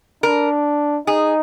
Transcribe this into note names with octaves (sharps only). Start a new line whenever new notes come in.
D4 A#4
D#4 G#4